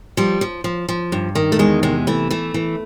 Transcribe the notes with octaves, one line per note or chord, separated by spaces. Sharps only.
F3 G3
F3
F3
F3
G2
D#3
A3
E2 G#3
C3 G#3
E3 A3
E3 A3
E3